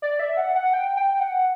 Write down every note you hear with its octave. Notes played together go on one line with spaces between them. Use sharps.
D5
E5
F#5
F#5
G5
G5
F#5